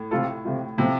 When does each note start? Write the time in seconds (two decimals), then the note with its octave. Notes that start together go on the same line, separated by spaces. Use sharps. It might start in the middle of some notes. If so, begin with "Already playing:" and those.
Already playing: A2
0.11 C3 A3 F4 A4
0.44 C3 A3 F4
0.77 A2 C3 F3 A3